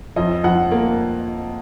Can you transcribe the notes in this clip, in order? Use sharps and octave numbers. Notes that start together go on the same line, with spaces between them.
F2 D#5
F2 F#5
A#3